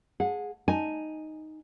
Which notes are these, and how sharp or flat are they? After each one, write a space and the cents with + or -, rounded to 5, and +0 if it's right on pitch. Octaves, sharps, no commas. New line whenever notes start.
G#4 +0 F#5 -30
D#4 +0 G#5 +0